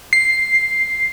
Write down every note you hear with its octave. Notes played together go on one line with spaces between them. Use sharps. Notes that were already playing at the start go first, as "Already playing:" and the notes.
C7